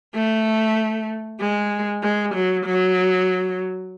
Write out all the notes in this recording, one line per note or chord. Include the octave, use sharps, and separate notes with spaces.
A3
G#3
G#3
F#3
F#3